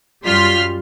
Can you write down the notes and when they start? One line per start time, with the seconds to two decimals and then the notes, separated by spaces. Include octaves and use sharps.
0.23 F#2 G3 F4 C6 F6 B6